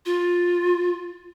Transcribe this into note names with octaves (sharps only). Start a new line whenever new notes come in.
F4